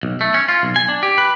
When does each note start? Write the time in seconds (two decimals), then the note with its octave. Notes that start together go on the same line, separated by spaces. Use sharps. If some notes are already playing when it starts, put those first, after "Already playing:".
0.03 B1
0.21 A3
0.34 C#4
0.48 F4
0.63 B1
0.76 G#5
0.88 D4
1.03 G4
1.18 B4